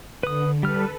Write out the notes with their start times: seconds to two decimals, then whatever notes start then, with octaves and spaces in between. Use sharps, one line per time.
0.23 D3 B4 D#6
0.63 G3 A4 B4 F6